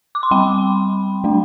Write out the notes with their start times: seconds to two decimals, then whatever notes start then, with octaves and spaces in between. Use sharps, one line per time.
0.15 D6
0.23 C6
0.31 G3 C4 G5 B5
1.24 F#3 A3 D4